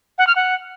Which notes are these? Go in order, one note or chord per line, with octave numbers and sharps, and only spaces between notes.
F#5
F6
F#5